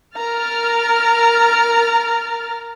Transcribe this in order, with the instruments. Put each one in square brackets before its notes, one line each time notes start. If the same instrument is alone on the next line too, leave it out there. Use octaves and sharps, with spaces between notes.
[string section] A#4 F6 A6 [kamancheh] A#5